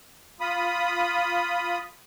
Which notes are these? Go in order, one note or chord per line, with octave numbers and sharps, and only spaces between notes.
F4 B5 D#6